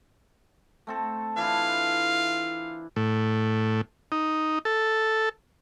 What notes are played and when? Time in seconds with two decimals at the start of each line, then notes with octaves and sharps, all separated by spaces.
0.87 A3 C4 A4
1.36 E3 D4 E4 F4 F5
2.96 A2
4.12 D#4
4.65 A4